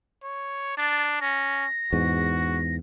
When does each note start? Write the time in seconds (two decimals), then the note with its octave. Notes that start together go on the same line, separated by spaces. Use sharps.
0.23 C#5
0.77 D4 A6
1.21 C#4 A#6
1.93 E2 G#2 F#4